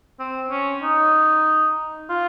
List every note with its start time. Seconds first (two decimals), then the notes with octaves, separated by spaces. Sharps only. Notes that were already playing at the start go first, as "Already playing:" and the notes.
0.20 C4
0.51 C#4
0.83 D#4
2.10 F4